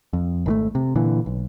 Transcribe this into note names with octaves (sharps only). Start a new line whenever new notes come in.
F2
G#1 D#3 A3
C3
A#2 D3 E3
B1